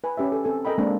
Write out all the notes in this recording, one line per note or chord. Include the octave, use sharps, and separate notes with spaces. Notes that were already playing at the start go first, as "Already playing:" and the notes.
B4 G#5
C#4 G4 B4 E5
A4
C4 A4 G#5
A4 A#4 D#5 G5 B5
G#3 A#3 C4 D4